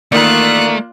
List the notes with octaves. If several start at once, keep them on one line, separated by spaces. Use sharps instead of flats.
E2 D#3 A3 A#3 F4 D5 A#5 F#6